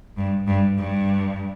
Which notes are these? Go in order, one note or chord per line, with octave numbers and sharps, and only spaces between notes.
G2
G2
G2